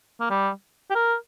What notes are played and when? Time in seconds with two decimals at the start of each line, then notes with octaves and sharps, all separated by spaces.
0.20 A#3
0.30 G3
0.90 G4
0.95 A#4